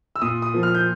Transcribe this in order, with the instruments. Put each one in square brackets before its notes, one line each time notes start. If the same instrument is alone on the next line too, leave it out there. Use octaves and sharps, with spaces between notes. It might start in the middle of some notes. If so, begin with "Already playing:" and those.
[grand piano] E6
A#2 D#6
D#6
F3 A#3
F6
G6